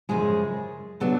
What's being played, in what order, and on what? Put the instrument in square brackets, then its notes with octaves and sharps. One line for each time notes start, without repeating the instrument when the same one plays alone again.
[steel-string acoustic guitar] F#2 C#3 F3 G#3 G#4
C#3 F#3 B3 D4 A4